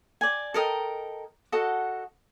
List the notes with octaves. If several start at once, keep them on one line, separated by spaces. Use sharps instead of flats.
D5 G#5
A4 A#4 D#5 G5
F#4 A4 D#5 F#5